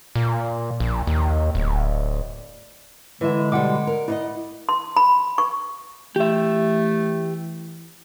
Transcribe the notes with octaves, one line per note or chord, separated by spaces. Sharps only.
A#2
A#1
D#2
D1
D3 E3 G#3 E5
B2 G3 F#5 D6
A#4
D#4 E4 C5 D#5
C6
B5
C#6
E3 A3 G4 E5